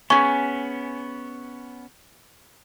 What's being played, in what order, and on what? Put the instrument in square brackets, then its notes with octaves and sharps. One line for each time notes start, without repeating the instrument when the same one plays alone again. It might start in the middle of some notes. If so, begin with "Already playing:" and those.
[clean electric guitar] B3 C#4 [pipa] G#4 G#5 [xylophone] C#6